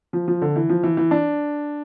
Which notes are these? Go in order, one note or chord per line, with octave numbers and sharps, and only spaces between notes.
F3
F3
D3
E3
F3
E3
E3
D4